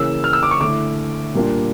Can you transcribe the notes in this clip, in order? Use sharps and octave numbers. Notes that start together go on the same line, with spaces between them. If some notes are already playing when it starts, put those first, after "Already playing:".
Already playing: C#3 E3 A#3 E6
F6
E6
D6
C#6
D3 A3 E4 D6
A#2 G3 A#3 D4 F4